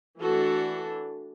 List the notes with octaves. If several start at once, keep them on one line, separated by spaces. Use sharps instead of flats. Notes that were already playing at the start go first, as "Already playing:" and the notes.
E3 A3 D4 F#4 A4